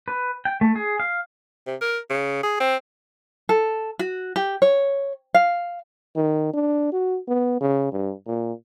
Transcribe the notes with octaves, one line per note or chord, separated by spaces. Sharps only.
B4
G5
A3
G#4
F5
C3
A#4
C#3
G#4
C4
A4
F#4
G4
C#5
F5
D#3
D4
F#4
B3
C#3
G2
A#2